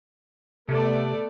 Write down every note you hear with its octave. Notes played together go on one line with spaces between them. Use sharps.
C3 A3 B3 D5